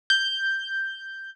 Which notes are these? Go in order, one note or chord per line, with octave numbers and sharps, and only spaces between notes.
G6